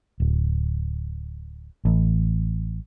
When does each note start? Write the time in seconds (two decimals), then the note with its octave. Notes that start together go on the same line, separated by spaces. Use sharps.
0.20 D1
1.85 A1